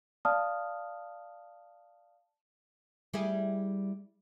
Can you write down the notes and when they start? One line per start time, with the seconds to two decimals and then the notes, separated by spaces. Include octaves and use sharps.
0.25 D5 F5 A5 D#6 F6
3.13 G3 E4 G#4